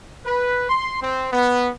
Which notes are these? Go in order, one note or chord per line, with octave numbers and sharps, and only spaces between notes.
B4
C6
C4
B3